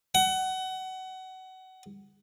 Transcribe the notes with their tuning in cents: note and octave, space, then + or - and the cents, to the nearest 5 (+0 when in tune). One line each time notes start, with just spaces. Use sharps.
F#5 +25